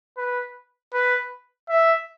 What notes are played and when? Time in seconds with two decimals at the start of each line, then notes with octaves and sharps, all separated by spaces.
0.17 B4
0.93 B4
1.69 E5